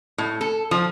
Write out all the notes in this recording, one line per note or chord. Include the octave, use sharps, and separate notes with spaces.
A2
A4
F3